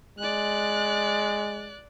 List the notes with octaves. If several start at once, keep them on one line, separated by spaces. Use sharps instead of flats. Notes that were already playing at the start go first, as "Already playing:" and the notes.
G#3 D5 F#6